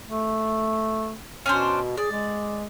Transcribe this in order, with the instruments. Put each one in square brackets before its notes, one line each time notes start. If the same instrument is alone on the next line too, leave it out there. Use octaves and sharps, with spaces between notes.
[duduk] A3
[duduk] B2 [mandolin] C#4 D4 C5
[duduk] G#4 [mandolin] D5
[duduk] G#3